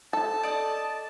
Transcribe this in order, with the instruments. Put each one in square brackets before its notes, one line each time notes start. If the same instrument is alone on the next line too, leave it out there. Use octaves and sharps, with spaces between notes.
[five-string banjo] A4 [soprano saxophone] A5
[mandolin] D5 D#5